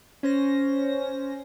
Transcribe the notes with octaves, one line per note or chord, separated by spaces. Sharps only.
C#4 C5 A#6